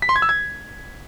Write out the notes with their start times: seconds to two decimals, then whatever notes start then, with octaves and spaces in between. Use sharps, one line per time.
0.02 B6
0.09 C6
0.16 G#6
0.22 E6
0.29 G#6